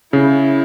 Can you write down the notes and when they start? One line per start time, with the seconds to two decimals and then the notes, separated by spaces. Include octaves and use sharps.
0.13 C#3 E4